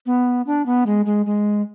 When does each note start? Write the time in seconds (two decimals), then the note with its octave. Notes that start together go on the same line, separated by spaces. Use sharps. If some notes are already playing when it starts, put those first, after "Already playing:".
0.06 B3
0.47 D4
0.66 B3
0.86 G#3
1.06 G#3
1.26 G#3